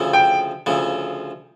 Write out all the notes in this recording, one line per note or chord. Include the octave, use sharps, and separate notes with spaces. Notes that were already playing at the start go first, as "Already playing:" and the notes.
Already playing: D2 C#3 F3
G5
D2 C#3 F3